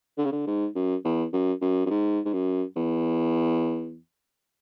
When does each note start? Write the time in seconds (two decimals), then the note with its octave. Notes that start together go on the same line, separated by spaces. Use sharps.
0.18 D3
0.25 C#3
0.32 D3
0.47 G#2
0.76 F#2
1.05 E2
1.33 F#2
1.62 F#2
1.86 F#2
1.90 G#2
2.25 G#2
2.33 F#2
2.77 E2